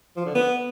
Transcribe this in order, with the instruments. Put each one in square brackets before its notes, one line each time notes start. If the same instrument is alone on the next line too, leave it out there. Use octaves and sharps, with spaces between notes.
[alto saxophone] F3
D3
B3